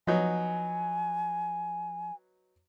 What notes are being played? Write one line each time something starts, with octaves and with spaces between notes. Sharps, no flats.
F3 F#3 B3 D#4 G#5